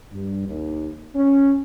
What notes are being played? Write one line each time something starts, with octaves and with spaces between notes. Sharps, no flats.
G2
D#2
C#4